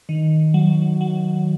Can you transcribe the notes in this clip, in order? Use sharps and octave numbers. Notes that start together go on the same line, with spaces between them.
D#3
F#3
F#3